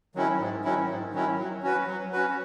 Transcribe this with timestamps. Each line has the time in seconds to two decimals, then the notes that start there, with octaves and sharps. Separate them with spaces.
0.15 D#3 F#3 C#4 E4
0.40 G#2
0.64 D#3 F#3 C#4 E4
0.89 G#2
1.13 D#3 F#3 C#4 E4
1.38 F#3
1.63 C#4 F#4 B4
1.87 F#3
2.12 C#4 F#4 B4